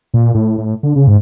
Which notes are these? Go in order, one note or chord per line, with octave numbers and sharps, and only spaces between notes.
A#2
A2
A2
D3
C#3
G#2